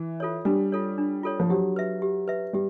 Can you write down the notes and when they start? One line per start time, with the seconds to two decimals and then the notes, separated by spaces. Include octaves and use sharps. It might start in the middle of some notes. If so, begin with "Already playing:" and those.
Already playing: E3
0.20 F4 A4 C#5
0.45 G3 D4
0.72 F4 A4 C#5
0.98 D4
1.23 F4 A4 C#5
1.40 F3
1.49 F#3 G4
1.76 B4 E5
2.02 G4
2.28 B4 E5
2.53 G3 G4